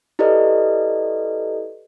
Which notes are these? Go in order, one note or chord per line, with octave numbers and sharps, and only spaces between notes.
E4 G4 A4 B4 D5 D#5